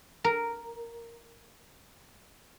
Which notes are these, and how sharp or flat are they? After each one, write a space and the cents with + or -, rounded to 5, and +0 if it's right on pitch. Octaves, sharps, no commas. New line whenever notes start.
A#4 -5